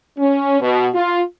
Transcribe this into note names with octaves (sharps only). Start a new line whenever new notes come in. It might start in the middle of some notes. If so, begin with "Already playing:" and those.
C#4
B2
F4